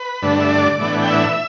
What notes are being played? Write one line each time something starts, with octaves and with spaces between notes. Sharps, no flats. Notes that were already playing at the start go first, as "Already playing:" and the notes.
Already playing: B4
G2 D3 A3 D4
E5
D5
A2 E3 B3 D4
G5
E5